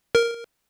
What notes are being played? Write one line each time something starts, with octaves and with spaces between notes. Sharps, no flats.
A#4